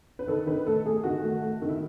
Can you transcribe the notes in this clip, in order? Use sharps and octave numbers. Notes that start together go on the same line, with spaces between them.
B4
D#3 A4
D#3 B4
A3 A4
A3 G#4
D#3 F#4
A3
A3
D#3
E4